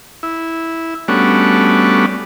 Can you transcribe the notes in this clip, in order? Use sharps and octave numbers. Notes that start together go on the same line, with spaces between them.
E4
G3 A3 B3 C#4 D4 F#4